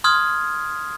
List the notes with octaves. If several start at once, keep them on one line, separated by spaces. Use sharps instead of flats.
C6 D#6 F6 G#6